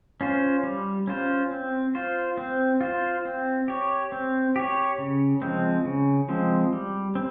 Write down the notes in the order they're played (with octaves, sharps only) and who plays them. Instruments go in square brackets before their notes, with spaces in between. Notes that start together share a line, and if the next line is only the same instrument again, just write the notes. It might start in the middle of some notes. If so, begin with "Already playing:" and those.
[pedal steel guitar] C#4 F4 C5
G3
C#4 F4 C5
C4
F4 C5
C4
F4 C5
C4
G4 C#5
C4
G4 C#5
C#3
F3 G#3 C4
C#3
F3 G#3 C4
G3
C4